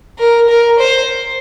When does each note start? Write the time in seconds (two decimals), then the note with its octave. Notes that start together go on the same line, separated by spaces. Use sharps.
0.19 A#4
0.49 A#4
0.79 C5